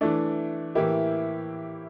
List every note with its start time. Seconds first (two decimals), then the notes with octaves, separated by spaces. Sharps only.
0.01 E3 A3 D4
0.75 A2 E3 A#3 E4 G4